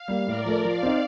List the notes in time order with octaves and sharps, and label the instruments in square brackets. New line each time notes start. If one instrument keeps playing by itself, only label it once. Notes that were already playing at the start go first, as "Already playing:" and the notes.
Already playing: [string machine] F5
[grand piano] G3 A#3
[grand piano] A2 [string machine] A#4 D5
[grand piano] F3 A3
[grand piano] F3 [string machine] D5 F5
[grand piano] C4 D#4